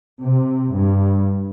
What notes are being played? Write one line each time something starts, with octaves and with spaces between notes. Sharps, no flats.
C3
G2